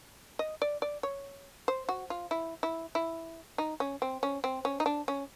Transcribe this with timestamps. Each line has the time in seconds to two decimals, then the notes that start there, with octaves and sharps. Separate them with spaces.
0.39 D#5
0.62 D5
0.82 D5
1.03 C#5
1.68 C5
1.89 F#4
2.10 F4
2.31 E4
2.63 E4
2.95 E4
3.58 D#4
3.80 C#4
4.02 C4
4.23 C#4
4.44 C4
4.65 C#4
4.80 D#4
4.86 D4
5.08 C#4